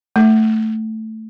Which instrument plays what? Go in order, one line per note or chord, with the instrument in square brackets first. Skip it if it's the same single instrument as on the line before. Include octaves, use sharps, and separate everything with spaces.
[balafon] A3